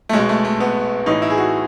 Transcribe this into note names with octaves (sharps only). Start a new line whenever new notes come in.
A3
B1 G#3
B2
A3
A3
B3
A1 A2 E3 D#4
E4
G#4
F#4